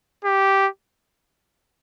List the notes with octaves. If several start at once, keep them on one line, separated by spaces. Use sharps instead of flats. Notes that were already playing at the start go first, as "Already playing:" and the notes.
G4